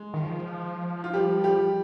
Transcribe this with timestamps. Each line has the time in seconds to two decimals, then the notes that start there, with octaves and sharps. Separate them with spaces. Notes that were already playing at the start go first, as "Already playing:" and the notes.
Already playing: G#3
0.14 D#3
0.23 F3
1.04 F4
1.13 G3 G4
1.44 G3 G4